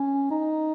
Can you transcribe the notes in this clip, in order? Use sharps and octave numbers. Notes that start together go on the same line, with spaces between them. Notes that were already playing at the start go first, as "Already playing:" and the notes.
Already playing: C#4
D#4